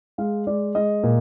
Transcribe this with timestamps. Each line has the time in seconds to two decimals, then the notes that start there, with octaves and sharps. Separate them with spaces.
0.18 G#3 F5
0.47 G#3 D5
0.75 G#3 D#5
1.03 A#2